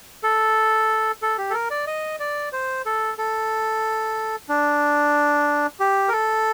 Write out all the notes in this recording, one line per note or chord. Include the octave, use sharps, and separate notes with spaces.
A4
A4
G4
A4
A#4
D5
D#5
D5
C5
A4
A4
D4
G4
A#4
A4